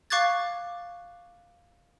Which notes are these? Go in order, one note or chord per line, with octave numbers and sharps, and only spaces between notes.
F5 C#6 D6 F#6 G#6 A6